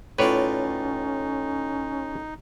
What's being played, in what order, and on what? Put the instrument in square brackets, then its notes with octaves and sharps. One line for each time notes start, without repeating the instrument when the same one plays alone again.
[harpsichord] A2 F4 [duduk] C#4 [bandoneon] D#4 [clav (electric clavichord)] B4 C#5 D5